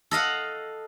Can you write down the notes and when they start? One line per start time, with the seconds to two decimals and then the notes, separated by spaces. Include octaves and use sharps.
0.11 A4 D#5 F5 F#5